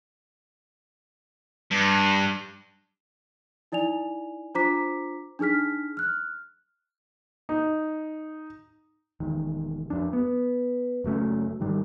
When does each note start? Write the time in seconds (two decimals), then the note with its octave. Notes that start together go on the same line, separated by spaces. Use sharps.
1.71 G2
3.72 D#4 E4 D5 G#5 F7
4.55 D4 F4 C5 A#5 D6 B6
5.39 D4 D#4 G#4 F6 B6
5.97 F6 F#6
7.49 D#4
9.20 E1 D#3
9.90 F2 D4
10.13 B3
11.04 F#1 F#3 A3 C#4
11.60 G#2 D#3 G3